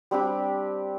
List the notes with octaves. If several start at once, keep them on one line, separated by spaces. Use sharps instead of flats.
G3 C4 D4 G4